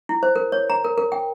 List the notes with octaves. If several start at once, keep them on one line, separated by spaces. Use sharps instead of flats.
E4
C5
A#4
C#5
A#5
A#4
A#4
G5